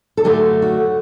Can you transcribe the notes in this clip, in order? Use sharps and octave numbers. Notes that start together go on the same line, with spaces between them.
A4
F#2 D3 F#3 A3 G4
F#4